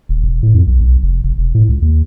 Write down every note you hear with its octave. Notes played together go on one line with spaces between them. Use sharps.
D#1
E1
A2
F2
B1
B1
F1
F1
E1
A2
C#2
D#2